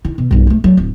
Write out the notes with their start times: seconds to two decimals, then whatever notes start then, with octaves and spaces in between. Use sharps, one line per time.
0.05 D#3 E4
0.18 B2
0.31 B1 G2
0.47 F3 A3
0.64 F#3 A3
0.77 D1